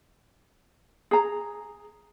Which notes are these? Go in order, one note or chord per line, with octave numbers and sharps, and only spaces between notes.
G#4 A#5